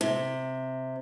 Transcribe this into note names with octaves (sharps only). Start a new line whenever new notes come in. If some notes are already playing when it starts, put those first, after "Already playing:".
C3